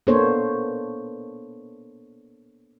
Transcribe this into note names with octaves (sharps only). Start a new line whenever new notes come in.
A#3 B3 D4 A4 C5 C#5